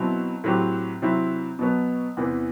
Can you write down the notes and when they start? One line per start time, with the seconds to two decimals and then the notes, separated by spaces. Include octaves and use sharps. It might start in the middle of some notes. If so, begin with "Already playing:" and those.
Already playing: B2 F#3 C4 E4
0.44 A2 F#3 C4 G4
1.02 C3 F#3 C4 E4
1.59 B2 F#3 B3
2.17 E2 C3 E3